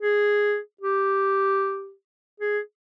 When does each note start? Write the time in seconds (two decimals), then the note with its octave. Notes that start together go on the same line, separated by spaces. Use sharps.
0.02 G#4
0.81 G4
2.40 G#4